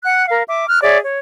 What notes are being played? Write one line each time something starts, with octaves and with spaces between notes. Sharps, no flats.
F#5 F#6
A#4 F5
E5 D6
F6 F#6
G#4 C#5 D5 E5
C#5